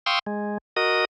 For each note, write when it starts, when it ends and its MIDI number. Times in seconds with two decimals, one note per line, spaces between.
0.06 0.19 77
0.06 0.19 79
0.06 0.19 84
0.06 0.19 85
0.06 0.19 87
0.06 0.19 88
0.27 0.58 56
0.77 1.05 66
0.77 1.05 70
0.77 1.05 75
0.77 1.05 87